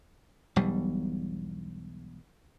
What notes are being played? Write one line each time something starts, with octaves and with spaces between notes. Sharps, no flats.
E1 B1 G3